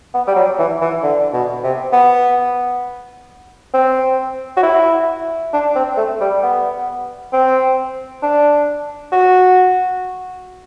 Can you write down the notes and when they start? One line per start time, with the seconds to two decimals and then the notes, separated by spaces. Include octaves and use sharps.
0.14 B3
0.27 G3
0.36 F#3
0.59 E3
0.81 E3
1.03 D3
1.33 B2
1.64 C3
1.93 B3
3.74 C4
4.57 F#4
4.63 E4
5.53 D4
5.76 C4
5.97 A3
6.21 G3
6.43 B3
7.33 C4
8.23 D4
9.12 F#4